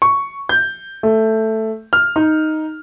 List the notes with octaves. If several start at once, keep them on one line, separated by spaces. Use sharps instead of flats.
C#6
G6
A3
F6
D#4